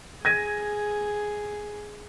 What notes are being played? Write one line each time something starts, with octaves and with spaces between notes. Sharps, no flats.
G#4 G#6 A#6 D#7